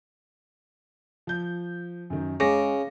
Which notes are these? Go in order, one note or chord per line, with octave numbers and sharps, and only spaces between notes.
F3 G6
F#2 D#3
C#3 G#3 D6 A#6